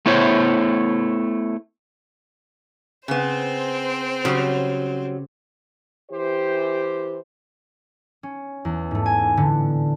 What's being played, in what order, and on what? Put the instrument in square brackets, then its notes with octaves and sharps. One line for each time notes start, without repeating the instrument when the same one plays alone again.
[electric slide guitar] A3 B3 E4 C5 C#5
[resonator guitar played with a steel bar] C#3 B3 [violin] C4 C5
[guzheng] C#3 [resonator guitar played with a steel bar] F#3 G3
[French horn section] E3 G4 C5
[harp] C#4
E2
G#2 A3
G#5
A2 D3 B3